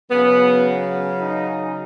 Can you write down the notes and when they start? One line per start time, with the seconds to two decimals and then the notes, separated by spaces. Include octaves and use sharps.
0.11 C#3 F#3 B3
1.19 D#4